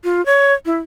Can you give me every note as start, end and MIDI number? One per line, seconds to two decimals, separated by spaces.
0.04 0.24 65
0.26 0.53 73
0.65 0.77 64